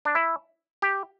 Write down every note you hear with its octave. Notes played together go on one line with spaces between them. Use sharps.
D4
E4
G4